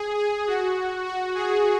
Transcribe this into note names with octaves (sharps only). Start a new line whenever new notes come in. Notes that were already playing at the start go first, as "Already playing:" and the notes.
Already playing: G#4
G#4
F#4
F#4
G#4